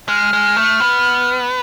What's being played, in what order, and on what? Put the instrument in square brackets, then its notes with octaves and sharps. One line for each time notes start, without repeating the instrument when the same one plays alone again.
[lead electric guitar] G#3 [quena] F6
[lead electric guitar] G#3
A3
B3